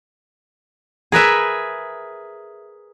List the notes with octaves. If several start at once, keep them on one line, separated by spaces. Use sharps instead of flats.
G#4 A#4 B4 E5